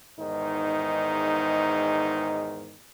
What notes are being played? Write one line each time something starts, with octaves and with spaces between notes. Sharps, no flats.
E2 G#2 D#3 D#4